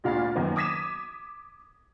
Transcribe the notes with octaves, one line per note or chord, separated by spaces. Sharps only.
D2 A#2 F5 B5 A6
F#2 D#3 F#3 A#3 B3
D6 D#6 G#6 B6 D#7 E7